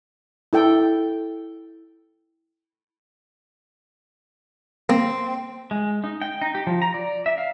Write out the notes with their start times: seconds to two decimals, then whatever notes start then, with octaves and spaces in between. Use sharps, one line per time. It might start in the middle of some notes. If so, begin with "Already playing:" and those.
0.53 E4 A4 G5
4.89 A#3 C4
5.71 G#3
6.04 D#4
6.22 G5
6.42 D#4
6.55 G4
6.67 F3
6.82 A#5
6.94 D5
7.26 E5
7.38 F5